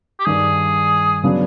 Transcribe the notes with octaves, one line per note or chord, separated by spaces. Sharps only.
G4
G2 D#3 G3 G#4
C#3 F#3 B3 D4